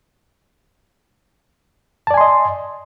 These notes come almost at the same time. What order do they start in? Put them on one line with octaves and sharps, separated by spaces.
A5 D5 G#5 C6 D#5